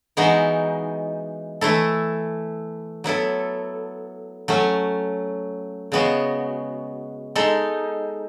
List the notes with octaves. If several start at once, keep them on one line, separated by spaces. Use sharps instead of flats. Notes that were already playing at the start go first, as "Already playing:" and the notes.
E3 G#3 B3 D#4 F#4
E3 A3 E4 A4
F#3 B3 E4 A4
F#3 A3 C#4
C#3 G#3 B3 F#4
G#3 D#4 A4